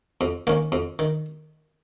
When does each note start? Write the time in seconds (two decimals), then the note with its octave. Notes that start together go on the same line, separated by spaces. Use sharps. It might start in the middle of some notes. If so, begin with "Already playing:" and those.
0.21 F2
0.47 D#3 A#3 C#4
0.72 F2
0.99 D#3